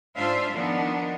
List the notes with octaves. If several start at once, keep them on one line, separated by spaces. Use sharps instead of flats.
G#2 D4 F4 C5 E5 F5
D#3 F3 B3 D4 D#4